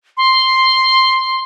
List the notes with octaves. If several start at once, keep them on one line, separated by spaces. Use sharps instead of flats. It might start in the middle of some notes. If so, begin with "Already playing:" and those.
C6